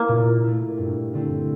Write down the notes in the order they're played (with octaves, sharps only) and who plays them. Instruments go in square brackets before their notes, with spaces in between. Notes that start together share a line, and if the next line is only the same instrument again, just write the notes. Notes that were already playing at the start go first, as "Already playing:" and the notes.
Already playing: [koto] A#3 [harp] E4
[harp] A#2
A3 E4
G2
D3 A3 C4 E4